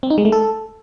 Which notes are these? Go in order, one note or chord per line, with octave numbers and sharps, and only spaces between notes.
C4
D#4
G#3
A3
A4